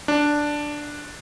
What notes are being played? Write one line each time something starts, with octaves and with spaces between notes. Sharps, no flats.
D4